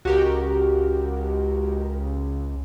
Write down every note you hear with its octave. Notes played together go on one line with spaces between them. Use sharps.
C#2 F#4 G4 A#4